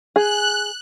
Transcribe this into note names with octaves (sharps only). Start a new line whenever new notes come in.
G#4 F#6